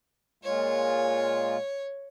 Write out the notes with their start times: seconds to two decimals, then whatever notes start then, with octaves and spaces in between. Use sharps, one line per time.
0.44 A#2 G#3 F4 C#5